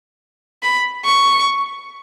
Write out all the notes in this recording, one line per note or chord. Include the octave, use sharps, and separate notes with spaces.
B5
C#6